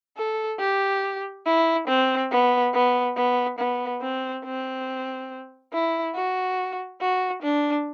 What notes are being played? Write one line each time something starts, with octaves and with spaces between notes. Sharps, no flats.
A4
G4
E4
C4
B3
B3
B3
B3
C4
C4
E4
F#4
F#4
D4